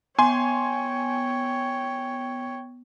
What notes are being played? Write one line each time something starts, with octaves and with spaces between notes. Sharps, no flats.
B3 C#5 G5 G#5 C6